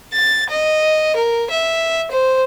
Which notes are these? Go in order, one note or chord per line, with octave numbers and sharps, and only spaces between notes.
A6
D#5
A#4
E5
C5